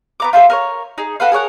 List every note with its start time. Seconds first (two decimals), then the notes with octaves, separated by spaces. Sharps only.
0.20 B3 A#5 D6
0.33 F4 G4 A4 E5
0.50 A#4 B4 C#5
0.98 D#4 G#4
1.20 F#4 A4 B4 F5
1.32 G#4 A#4 C#5 F#5